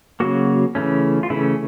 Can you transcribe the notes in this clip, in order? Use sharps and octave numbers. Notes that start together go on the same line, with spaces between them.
C#3 F#3 A#3 F#4
C#3 E3 A3 C#4
F4
C#3 E3 A3 C#4 E4